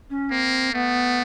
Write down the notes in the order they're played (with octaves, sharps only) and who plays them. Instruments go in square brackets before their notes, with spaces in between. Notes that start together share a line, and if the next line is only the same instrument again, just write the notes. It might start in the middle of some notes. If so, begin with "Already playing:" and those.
[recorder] C#4
[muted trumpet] A#3 [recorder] C4
[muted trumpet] A3 [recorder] B3